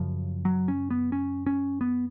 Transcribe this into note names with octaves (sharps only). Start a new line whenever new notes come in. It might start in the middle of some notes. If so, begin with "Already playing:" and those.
Already playing: F#2 C#3 F3
F#3
C#4
B3
C#4
C#4
B3